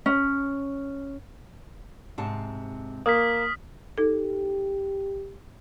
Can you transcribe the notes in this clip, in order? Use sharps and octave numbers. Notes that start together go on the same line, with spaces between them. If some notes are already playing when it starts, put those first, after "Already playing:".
C#4
G#2 C3 A5
A#3 D#6 F6 B6
D#4 G4 A4